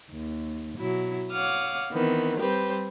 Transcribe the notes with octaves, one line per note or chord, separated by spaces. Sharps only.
D#2
B2 F#3 E4
C#5 F5 F#5 D6 D#6 F6
D#3 E3 B3 C4
G3 C4 G4 B4 C5